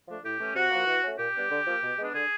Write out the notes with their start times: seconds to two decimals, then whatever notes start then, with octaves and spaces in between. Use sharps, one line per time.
0.08 F3 A3 D4
0.24 A2 G4
0.39 E3 A3 C#4
0.56 C3 F#4
0.71 F3 A#3
0.87 E3
1.03 A3 C#4
1.19 A#2 G4
1.35 G3 B3 D4
1.51 D3
1.67 F3 A#3
1.82 B2
1.98 G#3 B3 D4
2.14 D3 G#4